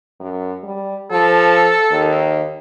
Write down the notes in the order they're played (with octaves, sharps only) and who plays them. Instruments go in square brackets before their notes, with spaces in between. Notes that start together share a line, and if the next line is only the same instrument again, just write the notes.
[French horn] F#2
G3
[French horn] F3 [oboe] A4
[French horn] D#2